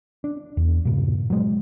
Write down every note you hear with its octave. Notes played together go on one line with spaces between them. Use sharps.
D4
E2
G2 A#2 C#3
F#3 G#3